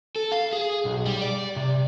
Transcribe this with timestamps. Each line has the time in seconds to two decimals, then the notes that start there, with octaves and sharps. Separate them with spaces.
0.16 A4
0.32 F5
0.53 G#4
0.85 B1
1.06 G3
1.22 D5
1.56 C3